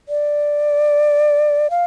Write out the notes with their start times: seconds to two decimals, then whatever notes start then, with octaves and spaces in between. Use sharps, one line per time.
0.09 D5
1.70 F5